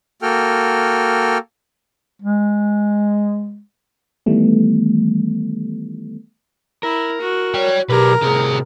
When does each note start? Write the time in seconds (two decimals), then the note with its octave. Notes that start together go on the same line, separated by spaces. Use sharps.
0.22 A#3 F#4 A4 G5 F6
2.22 G#3
4.26 D#3 E3 G3 A3 B3
6.83 E4 A#4
7.21 F#4
7.54 C#5 D5 G5
7.90 B1 G4 G#4 A#4 B4
8.22 A2 C3 G4 G#4 A#5